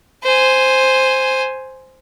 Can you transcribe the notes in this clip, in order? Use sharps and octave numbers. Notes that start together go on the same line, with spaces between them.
C5 G#5